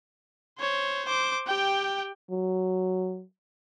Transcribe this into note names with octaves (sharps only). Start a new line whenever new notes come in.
C5 C#5
C5 D6
G4 G5
F#3